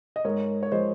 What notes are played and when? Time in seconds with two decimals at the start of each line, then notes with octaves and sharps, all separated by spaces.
0.16 D#5
0.25 G#2 A#4 C#5
0.63 C#5
0.72 F3 G#3 C5 D#5